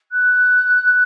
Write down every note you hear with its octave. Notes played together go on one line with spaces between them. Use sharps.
F#6